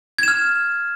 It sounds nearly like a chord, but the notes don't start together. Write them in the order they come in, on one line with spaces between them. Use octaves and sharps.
G#6 E7 F6